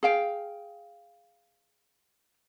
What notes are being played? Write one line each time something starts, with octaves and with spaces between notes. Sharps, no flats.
G#4 F5 G5